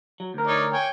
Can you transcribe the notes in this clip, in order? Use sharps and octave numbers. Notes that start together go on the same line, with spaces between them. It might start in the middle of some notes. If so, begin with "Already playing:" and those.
F#3
D2 A#4
D#4 C#5 D5
C#5 G5 G#5